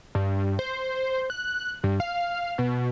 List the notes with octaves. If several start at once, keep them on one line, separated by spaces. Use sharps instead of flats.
G2
C5
F#6
G2
F5
B2